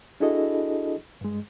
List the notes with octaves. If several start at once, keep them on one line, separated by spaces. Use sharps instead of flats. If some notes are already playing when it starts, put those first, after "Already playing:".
D4 E4 F#4 G#4 A4 D#5
G2 G#3